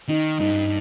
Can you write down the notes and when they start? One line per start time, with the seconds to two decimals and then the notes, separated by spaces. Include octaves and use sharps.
0.08 D#3 D#4
0.39 G2 D#4